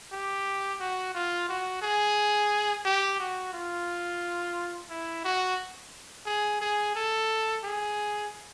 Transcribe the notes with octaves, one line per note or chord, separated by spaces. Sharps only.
G4
F#4
F4
F#4
G#4
G4
F#4
F4
E4
F#4
G#4
G#4
A4
G#4